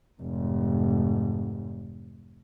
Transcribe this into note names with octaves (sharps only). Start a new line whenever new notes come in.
F1 G#2